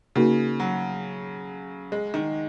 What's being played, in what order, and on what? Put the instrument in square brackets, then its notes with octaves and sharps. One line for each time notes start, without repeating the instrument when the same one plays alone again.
[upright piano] C#3 [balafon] A#3 D#4 F#4 A#4
[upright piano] F#3
G#3
D#3